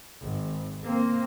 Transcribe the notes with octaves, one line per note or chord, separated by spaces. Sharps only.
G#1
A#3 C4